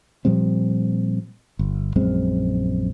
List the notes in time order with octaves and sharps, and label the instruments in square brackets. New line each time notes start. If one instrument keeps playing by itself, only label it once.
[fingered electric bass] A#2 F3 G3 C4
G1
A#1 F#2 G#3 C4